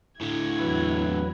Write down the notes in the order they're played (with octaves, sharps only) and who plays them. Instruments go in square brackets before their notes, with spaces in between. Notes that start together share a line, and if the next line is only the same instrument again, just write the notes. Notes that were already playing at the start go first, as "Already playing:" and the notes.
[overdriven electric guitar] A2 D3 [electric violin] E4 G#6
[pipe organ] E2 F#3 B4